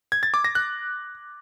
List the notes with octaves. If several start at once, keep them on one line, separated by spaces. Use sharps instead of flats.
G#6
A6
D6
A#6
F#6